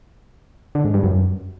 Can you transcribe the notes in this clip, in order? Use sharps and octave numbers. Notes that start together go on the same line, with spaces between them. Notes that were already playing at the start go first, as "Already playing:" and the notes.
D3
G#2
G2
F#2